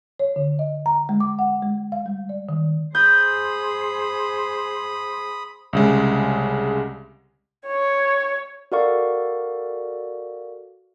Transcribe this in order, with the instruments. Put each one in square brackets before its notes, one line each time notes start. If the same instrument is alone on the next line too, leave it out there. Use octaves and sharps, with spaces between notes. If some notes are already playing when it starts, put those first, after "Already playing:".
[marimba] C#5
D3
D#5
A#5
G#3
D6
F#5
G#3
F5
G3
D5
D#3
[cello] G#4 C5 [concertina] B5 D#6 [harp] G6
[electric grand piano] C2 C#3 G#3
[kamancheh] C#5
[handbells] F#4 A4 A#4 D5 F5 C#6